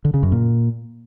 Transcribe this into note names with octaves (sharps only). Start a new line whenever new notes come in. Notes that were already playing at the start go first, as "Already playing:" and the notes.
D3
C#3
F#2
A#2